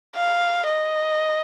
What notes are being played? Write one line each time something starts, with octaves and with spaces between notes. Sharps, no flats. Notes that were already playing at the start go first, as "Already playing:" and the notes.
F5
D#5